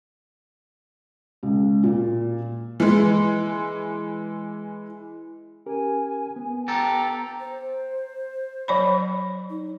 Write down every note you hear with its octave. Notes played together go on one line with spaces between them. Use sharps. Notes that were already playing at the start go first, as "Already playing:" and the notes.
C#2
A#2
E3 G#3
C#4 G4 A#4 G#5
B3
G4 A4 A#5
C5
F#3 C#5 B5
D#4